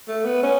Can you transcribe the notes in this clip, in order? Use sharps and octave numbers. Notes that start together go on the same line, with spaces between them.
A3
B3
C#4